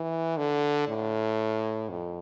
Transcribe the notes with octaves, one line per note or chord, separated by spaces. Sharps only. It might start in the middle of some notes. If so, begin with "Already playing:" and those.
Already playing: E3
D3
A2
F2